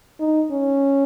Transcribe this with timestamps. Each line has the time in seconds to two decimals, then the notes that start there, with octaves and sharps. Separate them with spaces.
0.20 D#4
0.51 C#4